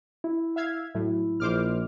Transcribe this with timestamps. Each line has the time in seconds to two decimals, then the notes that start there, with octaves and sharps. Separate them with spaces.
0.24 E4
0.56 E5 F5 G#6
0.95 A2 F#3 E4
1.40 A#1 C5 D6 F6